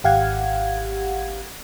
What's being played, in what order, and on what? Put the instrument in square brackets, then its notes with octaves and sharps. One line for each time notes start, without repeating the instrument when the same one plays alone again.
[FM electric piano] G#1 G4 F5 F#5 G#6